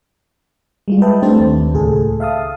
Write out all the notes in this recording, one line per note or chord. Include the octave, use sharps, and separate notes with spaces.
G3 G#3 F4
B4 D#5 E5 G5 A5
A3 C4 D4 G4 C5 A5
D#2
C#2 A2 G#4 A4
E5 F5 A5 D#6